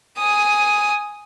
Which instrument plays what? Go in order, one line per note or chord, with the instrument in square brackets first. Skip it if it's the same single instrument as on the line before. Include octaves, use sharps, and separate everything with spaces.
[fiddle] G#5 D#6